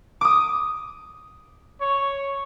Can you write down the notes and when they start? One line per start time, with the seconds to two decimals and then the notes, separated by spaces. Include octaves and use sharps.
0.21 D6 D#6
1.81 C#5